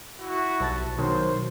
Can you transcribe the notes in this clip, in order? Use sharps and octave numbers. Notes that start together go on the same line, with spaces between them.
E4 F#4
B1 A5 A6
B2 D#3 F#3 C5